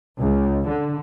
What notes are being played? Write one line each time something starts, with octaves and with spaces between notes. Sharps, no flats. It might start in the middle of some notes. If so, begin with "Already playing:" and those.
C#2
D3